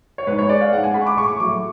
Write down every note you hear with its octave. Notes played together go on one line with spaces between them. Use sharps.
C#5
G#2 B4
C#5
G#3 D5
F5
G#2 F#5
G#5
G#3 B5
C#6
D6
A2 C#6
D6
C#6
F#3 A3 D6
C#6